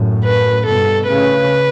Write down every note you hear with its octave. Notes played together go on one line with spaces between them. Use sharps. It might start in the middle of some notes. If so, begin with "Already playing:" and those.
Already playing: F#2 A2
B4
G2 B2 A4
A2 C#3 B4